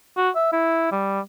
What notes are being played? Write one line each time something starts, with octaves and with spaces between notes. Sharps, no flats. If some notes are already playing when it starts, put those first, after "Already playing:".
F#4
E5
E4
G3